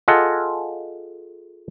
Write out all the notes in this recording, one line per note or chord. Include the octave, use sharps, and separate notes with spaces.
F4 G#4 A4 D#5 F#5